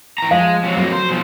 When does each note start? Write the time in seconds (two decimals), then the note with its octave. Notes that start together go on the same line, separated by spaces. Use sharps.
0.18 E3 A#5
0.31 F3 G#3 F5
0.64 C3 F#3
0.77 F2 F#3 A3 A#3
0.93 C5
1.09 B1 F3